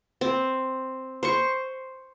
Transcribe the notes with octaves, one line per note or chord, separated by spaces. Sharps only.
C4
C5 C#6